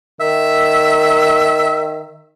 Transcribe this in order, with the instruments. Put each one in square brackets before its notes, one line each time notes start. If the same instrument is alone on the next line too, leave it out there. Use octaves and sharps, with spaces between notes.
[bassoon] D#3 [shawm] E5